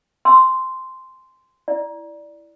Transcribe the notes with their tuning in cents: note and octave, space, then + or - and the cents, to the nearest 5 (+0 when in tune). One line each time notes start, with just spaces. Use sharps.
G#5 +0 C6 -5 E6 +0
E4 +0 D5 +0